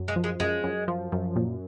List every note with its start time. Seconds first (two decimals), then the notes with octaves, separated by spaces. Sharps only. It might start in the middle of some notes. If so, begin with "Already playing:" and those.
Already playing: F#2
0.08 G#3
0.16 F3
0.24 G#3
0.40 F#2 G#3
0.64 F#2
0.88 F3
1.12 F#2
1.36 A#2